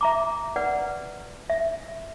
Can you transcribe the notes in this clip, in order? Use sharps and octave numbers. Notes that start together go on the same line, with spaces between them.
E5 A#5 D6
B4 D5 F#5
E5